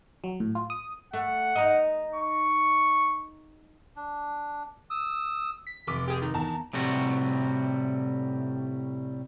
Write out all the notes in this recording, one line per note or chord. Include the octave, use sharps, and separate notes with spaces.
F#3
A2
F4
D#6
A3 F#5
D#4 D#5
C#6
D4
D#6 E6
B6
F1 D6
G4 G#4
D#3
E2 A5 A#5
A2 C3 G3 F#4